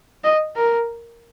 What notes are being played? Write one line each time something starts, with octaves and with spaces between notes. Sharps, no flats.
D#5
A#4